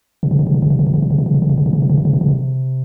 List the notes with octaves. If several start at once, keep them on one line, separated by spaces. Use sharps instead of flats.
C3
C#3
C3
C#3
C3
C#3
C3
C#3
C3
C#3
C3
C#3
C3
C#3
C3
C#3
C3
C#3
C3
C#3
C3
C#3
C3
C#3
C3
C#3
C3